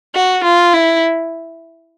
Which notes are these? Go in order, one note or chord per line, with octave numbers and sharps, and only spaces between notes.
F#4
F4
E4